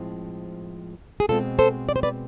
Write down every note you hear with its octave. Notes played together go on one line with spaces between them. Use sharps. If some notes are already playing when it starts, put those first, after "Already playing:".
Already playing: A2 F3 G#3 C4
G#4
B2 G#3 C4 F4 A4
A4 C5
D5
C5
B4 D5